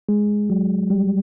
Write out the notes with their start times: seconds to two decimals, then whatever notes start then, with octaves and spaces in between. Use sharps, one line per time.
0.09 G#3
0.50 F#3
0.90 G3